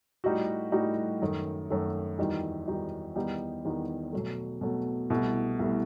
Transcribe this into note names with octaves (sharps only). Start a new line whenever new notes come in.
A2 G3 D#4 F#4
A2 G3 D#4 F#4
F#2 D#3 A3
F#2 D#3 A3
E2 D#3 G3 D#4 F#4
E2 D#3 G3 D#4 F#4
E2 D#3 G3 B3 D#4
E2 D#3 G3 B3 D#4
B2 F#3 A3
B2 F#3 A3
C2 B2 A3 E4
C2 B2 A3 E4